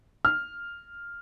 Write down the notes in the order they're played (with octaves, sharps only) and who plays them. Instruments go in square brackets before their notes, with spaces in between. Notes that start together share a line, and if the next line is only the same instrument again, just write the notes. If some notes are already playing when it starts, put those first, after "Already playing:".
[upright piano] F6